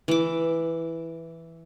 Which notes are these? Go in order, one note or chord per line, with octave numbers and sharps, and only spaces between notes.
E3 D6